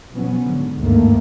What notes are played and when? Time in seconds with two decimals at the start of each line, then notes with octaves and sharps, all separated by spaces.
0.11 B2 F3 F#3 B3 C#4
0.41 G#2 D3
0.79 G#1 D2 G2 D#3 A3 A#3